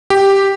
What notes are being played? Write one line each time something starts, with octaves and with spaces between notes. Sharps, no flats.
G4